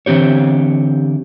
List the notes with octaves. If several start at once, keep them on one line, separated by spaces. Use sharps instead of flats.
D3 E3 C4 G4 C#5